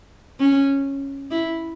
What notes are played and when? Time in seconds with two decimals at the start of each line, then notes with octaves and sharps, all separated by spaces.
0.39 C#4
1.31 E4